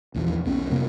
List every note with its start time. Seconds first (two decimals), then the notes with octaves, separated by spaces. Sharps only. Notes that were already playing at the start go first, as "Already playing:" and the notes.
0.14 A#1 E2 F3
0.45 B1 B3 C#4
0.70 F2 C3 A#3